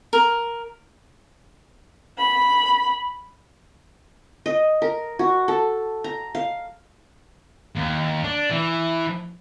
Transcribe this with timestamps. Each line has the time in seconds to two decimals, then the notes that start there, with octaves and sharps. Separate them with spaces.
0.13 A#4
2.18 B5
4.46 D#5
4.82 A#4
5.19 F#4
5.48 A4
6.04 A#5
6.35 F5
7.75 D#2
8.24 D4
8.50 E3